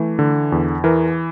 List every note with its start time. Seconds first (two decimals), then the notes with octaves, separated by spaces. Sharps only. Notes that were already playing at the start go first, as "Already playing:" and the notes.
Already playing: E3 A3
0.19 D3
0.52 E2
0.84 E3 A#4